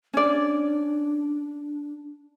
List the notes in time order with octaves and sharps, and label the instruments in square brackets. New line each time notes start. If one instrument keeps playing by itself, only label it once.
[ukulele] C#4 D5 [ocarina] D4